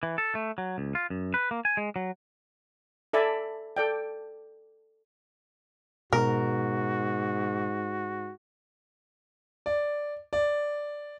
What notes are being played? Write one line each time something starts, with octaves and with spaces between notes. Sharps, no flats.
E3
A4
A3
F#3
C#2
F4
F#2
B4
A#3
G#5
G#3
F#3
A4 D5 E5 G#5 A5 B5
A4 D5 G5
G#2 B2 F#4 A#4
D5
D5